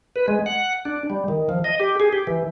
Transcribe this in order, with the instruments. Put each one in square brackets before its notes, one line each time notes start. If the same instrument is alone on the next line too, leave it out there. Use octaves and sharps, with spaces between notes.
[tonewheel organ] B4
G#3
F#5
D4
G3
D#3
F3
D#5
G4
G#4
G4
E3